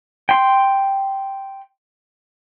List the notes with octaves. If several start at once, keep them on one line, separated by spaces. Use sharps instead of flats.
G5 C6